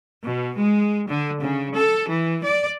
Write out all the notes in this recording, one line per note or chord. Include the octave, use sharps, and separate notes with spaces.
B2
G#3
D3
C#3
A4
E3
D5